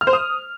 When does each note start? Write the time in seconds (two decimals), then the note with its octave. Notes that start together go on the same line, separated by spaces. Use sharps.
0.01 F6
0.07 C5
0.13 D#6